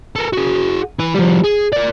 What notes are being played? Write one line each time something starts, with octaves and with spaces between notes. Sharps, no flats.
A4 A#4
F#4 G#4
E4 B4
F3 G3
G#4
A#4 D5